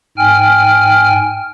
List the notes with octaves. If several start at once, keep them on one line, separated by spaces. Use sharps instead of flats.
G#2 G5 G#5 F6